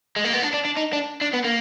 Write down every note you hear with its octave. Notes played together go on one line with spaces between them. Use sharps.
G#3
A#3
B3
D4
D4
D4
D#4
D4
D4
B3
A#3